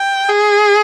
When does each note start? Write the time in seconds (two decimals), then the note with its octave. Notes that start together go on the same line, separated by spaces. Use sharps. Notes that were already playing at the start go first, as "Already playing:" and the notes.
Already playing: G5
0.29 G#4